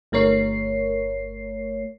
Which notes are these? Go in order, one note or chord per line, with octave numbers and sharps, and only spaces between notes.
G1 A3 A#4 C#5 C7